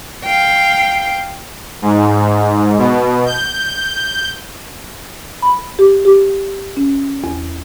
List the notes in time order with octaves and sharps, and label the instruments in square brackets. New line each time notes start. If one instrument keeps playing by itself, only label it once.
[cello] F5 G5
[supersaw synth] G#2
B2
G6
[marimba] B5
G4
G4
C#4
E2